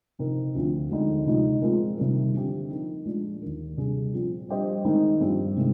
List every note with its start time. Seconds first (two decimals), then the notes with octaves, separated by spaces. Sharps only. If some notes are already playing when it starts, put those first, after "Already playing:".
0.19 C3 F3 C4 D#4 A#4
0.55 D2 D3 F3 C4
0.91 D2 D3 G#3 C4 D#4
1.26 C3 F3 G#3 D#4
1.62 A#2 G#3 C4 F4 A#4
1.98 C3 D#3 G3 A#3
2.34 D3 F3 C4 G4
2.70 F3 A#3 D#4
3.05 A#2 G#3 D4
3.42 D#2 D#3 A#3
3.77 C3 G3 D4 G#4
4.13 A#2 F3 C4
4.49 G3 D4 G4 C5 D#5
4.85 D#3 G#3 C4 D#4
5.21 G2 F3 C4 G4
5.57 C3 D#3 G#3